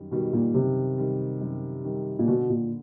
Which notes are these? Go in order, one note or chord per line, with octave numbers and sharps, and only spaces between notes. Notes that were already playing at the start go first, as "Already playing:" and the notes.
Already playing: F#2 D#3 G3
B2 D#3 G3
A#2
F#2 C3
D#3 G3
F#2
D#3 G3
A#2
B2 D3
A#2